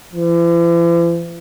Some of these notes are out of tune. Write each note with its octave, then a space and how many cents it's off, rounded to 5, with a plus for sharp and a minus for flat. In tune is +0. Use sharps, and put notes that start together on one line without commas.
E3 +45